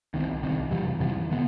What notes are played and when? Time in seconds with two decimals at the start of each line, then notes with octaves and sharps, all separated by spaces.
0.14 C2 C3 D#3
0.42 C2 C3 D#3
0.71 F2 C3 E3 G3
1.00 F2 C3 E3 G3
1.30 D3 G3 B3